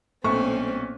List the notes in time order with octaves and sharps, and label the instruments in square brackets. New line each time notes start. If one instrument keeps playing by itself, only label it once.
[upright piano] B1 C#6 [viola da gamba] A#2 C#4 [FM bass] A3 [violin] C4